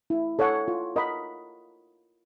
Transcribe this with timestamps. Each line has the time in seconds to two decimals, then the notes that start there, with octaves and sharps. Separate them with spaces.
0.10 E4
0.39 A4 C#5 F#5
0.68 F4
0.96 A#4 D#5 F#5 B5